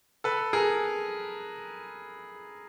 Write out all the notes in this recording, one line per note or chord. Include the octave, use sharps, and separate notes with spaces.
A4 B4
G#4 A#4